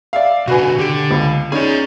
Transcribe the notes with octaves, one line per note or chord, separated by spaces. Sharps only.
D5 E5 F5
B2 D3 F#4 B4 G#5
D3 G4 D7
C#2
C#4 D#4 G#4 D5